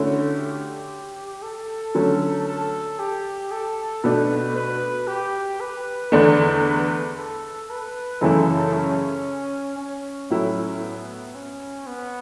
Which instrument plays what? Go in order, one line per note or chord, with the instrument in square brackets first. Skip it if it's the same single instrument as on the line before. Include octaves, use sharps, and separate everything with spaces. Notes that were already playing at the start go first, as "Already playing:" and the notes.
Already playing: [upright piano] D3 A3 C#4 E4 [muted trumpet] F#4
[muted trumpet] G4
A4
[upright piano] D3 F#3 A3 C#4
[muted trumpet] A4
G4
A4
[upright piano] B2 A3 D4 [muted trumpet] B4
[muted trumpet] B4
G4
B4
[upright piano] E2 D3 A3 D4 [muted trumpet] B4
[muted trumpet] A4
B4
[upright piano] F#2 C#3 E3 A3 E4 [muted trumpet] A4
[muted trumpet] C#4
C#4
[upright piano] A2 F#3 A3 E4
[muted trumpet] B3
C#4
B3